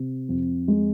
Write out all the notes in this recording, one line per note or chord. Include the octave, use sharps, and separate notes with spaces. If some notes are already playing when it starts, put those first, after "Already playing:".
Already playing: C3
F2
G#3